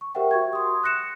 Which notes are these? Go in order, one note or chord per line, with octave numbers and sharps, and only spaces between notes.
C#6
G4 A#4 C5 E5 F#5 G5
F#4 C#6 G#6
C6 D#6
F#6 A#6 C#7 E7